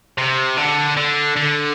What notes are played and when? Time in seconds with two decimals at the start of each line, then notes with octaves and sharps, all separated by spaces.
0.18 C3
0.57 D3
0.97 D3
1.37 D3